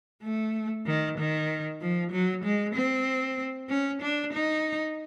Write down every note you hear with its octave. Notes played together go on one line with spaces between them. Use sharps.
A3
D#3
D#3
F3
F#3
G#3
C4
C#4
D4
D#4